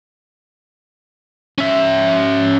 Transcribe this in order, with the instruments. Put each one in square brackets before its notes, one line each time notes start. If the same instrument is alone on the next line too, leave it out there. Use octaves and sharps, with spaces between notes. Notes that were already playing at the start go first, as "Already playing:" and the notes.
[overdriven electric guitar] C#4 E5